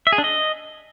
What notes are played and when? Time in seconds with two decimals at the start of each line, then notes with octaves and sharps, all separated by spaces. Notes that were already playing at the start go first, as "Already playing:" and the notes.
0.07 E5
0.12 G#4
0.18 D4
0.24 D#5